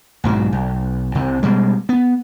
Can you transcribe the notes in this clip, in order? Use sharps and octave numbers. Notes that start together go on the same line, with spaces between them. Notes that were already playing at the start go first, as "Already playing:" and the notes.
B1 G#2 F3 F#3
B1
C2 C3
B2 G3 G#3
B3